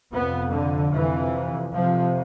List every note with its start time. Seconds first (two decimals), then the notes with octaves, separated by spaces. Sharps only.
0.12 F2 C3 B3
0.52 D3
0.92 F2 C3 E3
1.73 F2 C3 F3